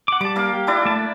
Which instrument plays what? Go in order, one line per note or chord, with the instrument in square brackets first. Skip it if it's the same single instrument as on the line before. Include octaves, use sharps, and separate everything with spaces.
[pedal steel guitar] F#5 D6
[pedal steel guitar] G3 A5 [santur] D6
[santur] A#3 A#4 F5
[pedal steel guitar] G4
[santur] D4 E4 D5
[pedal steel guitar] A3 A5